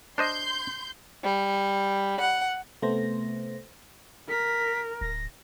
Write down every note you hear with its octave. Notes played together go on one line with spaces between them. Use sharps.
D4 C5 D#5 C6 G6
G3
F#5
C3 A3 B3 C5 A#6
A#4 B6
D1 A#6